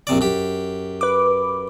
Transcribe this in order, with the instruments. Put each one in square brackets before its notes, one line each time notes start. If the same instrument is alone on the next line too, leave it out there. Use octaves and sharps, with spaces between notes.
[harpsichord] A#1 C3 D5
F#2 G4
[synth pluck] B4 D6